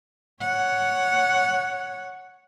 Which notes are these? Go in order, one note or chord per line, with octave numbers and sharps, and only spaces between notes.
C#5 F#5